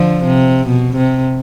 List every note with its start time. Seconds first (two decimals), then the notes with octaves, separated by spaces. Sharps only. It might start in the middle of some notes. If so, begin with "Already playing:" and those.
Already playing: D3 F3
0.24 C3
0.68 B2
0.97 C3